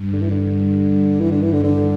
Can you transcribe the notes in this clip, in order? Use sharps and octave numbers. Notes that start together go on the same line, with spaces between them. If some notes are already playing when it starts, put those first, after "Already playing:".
Already playing: G2
D3
E3
G2 D3
E3
D3
E3
D3
D3